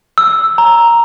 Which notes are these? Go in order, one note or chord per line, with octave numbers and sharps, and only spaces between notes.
E6
A#5